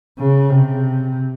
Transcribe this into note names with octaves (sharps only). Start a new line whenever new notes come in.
C#3
C3